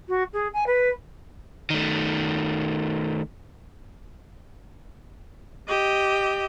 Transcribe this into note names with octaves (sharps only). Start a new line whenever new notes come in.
F#4
G#4
G#5
B4
D#3 A3
G4 D#5